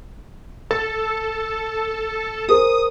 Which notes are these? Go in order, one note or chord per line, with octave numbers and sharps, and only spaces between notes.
A4 A6
G#4 A#4 C5 D#6